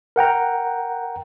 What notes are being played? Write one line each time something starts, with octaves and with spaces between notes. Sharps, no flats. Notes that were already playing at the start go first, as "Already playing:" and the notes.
A#4 F#5 G5 A#5